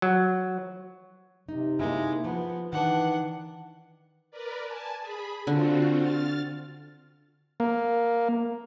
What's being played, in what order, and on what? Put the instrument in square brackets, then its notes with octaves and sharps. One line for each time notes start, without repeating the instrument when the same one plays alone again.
[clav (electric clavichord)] F#3
[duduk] C3 [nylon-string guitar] D#4
[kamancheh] G#3 [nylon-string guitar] A#3 D#4 E4
[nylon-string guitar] F3 [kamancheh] B3
[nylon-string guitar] D#3 B4 [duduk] E3 [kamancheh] D4 F#5
[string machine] A#4 B4 D5
G#5 A5
G#4 B5
[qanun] D3 [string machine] C4 F4 F#4
[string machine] F6 A6
[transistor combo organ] A#3